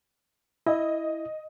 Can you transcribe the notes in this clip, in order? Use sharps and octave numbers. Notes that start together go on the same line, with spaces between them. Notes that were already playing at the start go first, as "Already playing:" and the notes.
E4 D#5